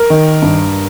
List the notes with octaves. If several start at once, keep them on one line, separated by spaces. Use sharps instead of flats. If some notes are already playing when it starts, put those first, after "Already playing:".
Already playing: A#4
D#3
G2